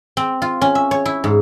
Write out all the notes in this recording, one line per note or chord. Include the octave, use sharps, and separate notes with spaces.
C4
F4
C#4
E5
C#5
E4
G#2